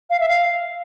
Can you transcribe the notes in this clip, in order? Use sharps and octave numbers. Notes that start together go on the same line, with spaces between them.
F5
E5
F5